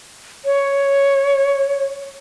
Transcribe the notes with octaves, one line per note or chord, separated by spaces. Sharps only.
C#5